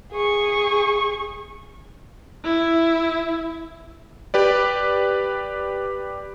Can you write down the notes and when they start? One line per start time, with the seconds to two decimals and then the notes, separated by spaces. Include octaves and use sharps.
0.12 G#4 C#6
2.44 E4
4.34 G4 B4 D5